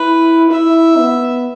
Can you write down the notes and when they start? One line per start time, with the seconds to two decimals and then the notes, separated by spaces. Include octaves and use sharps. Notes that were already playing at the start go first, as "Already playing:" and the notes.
Already playing: E4 B4
0.51 E4 E5
0.98 B3